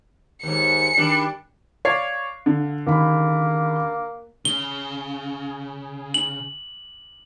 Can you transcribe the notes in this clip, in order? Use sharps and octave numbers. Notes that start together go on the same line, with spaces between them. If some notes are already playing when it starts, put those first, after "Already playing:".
D#2 G#2 C#7
D#3 G3 D4
C#5 D5 F5 C7
D3
D#2 C#3 A#3 B5
C#3 G7
F#7